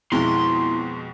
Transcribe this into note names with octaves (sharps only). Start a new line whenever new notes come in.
F2 B2 G#3 B3 E4 C6